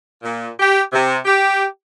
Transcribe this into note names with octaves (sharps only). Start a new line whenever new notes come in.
A#2
G4
C3
G4